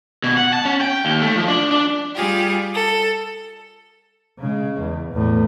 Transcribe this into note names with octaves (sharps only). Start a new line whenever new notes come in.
B2
F#5
A5
C#4
G5
D#2
A3
F3
D4
D4
G3 F4 G4 G#4
A4
C#3 G#3
E2
E2 A2